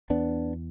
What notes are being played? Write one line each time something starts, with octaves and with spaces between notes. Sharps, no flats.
E2 B3 D4